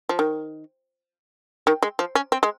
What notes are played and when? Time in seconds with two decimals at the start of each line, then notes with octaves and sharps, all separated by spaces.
0.09 F3
0.19 D#3
1.67 D#3
1.83 G#3
1.99 F3
2.15 C#4
2.32 C4
2.43 G#3